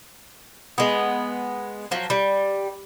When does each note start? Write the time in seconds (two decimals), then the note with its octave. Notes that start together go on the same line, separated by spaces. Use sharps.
0.78 G#3 B3
1.91 F3 F#3
2.10 G3